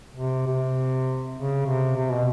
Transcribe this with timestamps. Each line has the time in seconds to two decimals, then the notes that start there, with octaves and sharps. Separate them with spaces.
0.16 C3
0.46 C3
1.36 C#3
1.67 C3
1.96 C3
2.12 B2